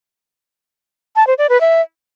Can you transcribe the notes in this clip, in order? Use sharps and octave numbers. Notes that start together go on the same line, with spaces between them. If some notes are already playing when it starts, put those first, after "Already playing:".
A5
C5
D5
B4
E5